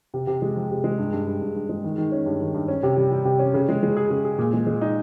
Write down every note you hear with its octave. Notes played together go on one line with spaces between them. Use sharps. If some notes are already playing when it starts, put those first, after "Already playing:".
C3
C3
G#3
F3
C3
G#3
G2
G2
G2
G2
G2
G#3
D#3
D#3
C#4
G2
D#3
G2
C#4
C3
G3
G3
C3
C#4
C#3
G#3
G#3
G#4
C#3
G#4
A#2
G#3
G#3
D#4